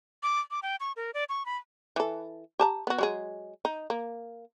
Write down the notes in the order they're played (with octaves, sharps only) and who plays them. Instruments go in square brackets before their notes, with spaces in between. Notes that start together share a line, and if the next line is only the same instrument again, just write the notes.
[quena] D6
D6
G5
C#6
A#4
D5
C#6
B5
[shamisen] E3 A4
G4 A5 A#5
B3 F#4
F#3 G#3 G#4
D#4
A#3